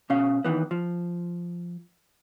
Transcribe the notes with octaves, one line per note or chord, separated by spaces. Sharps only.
B2 C#4 F5
D#2 D#3 E3 B3
F3